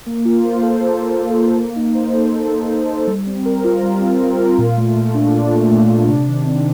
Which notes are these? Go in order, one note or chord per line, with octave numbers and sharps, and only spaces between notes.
A#3
F4
C5
A4
A#3
F4
C5
A4
A#3
D#4
C5
A4
A#3
D#4
C5
A4
G3
C4
A#4
F4
G3
C4
A#4
F4
A#2
A3
A#2
D4
A#2
A3
A#2
D4
C3
D#3
C4